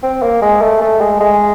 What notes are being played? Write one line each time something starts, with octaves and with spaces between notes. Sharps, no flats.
C4
A#3
G#3
A3
A3
G#3
G#3